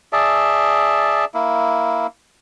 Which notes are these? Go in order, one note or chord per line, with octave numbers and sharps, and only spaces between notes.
G#4 D5 E5 A5
A#3 E4